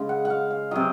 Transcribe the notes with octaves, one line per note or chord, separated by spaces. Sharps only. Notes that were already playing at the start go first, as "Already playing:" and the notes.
Already playing: C#3 G#3
F#5
F#5
F5
F5
C3 F#3 D#5